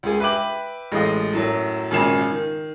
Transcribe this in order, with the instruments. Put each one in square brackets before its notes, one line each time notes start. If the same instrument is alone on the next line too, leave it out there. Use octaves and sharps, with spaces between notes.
[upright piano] C#2 G#4
B4 E5 G5 D6 F#7
A1 G#3 A3 D#5
F#2 A2 F#3
G#1 A#2 C#3 G#5 C7 E7
D#3